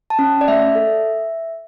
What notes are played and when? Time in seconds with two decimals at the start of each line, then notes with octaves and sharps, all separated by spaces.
0.10 A5
0.19 C#4
0.41 D5
0.48 A3 E5
0.75 A4